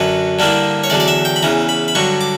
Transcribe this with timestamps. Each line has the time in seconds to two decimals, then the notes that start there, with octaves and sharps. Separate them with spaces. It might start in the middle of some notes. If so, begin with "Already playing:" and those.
Already playing: F#2 D3 F#3 B4
0.39 G2 D3 G3 A#3 E4
0.84 C#5
0.90 E2 D3 F#3 D5
1.00 D5
1.08 E5
1.25 G5
1.36 B5
1.42 E2 C#3 E3 A#5
1.69 B5
1.88 B5
1.95 G2 D3 F#3 C#6
2.21 D6